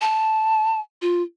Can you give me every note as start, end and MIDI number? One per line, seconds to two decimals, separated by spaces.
0.01 0.80 81
1.02 1.22 65